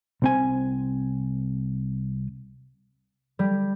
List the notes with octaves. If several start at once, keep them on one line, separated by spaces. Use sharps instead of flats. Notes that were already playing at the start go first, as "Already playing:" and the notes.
C2 C4 G#5
G3